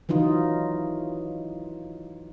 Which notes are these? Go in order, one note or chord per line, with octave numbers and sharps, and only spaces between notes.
E3 F#3 D#4 F4